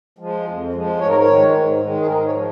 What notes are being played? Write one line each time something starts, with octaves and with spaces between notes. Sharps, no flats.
F3 G#3
F2
F3 G#3
G#2 C#5
A#4
C#5
D#3 G#3
G#2
D#3 G#3
G#4
G#2 A#4
C#5
F3